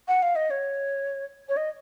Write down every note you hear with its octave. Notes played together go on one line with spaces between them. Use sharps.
F#5
F5
D#5
C#5
C#5
D#5